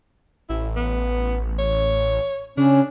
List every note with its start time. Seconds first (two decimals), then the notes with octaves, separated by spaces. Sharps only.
0.50 A1 E4
0.76 B3
1.59 C#5
2.57 C#3 C#4 D4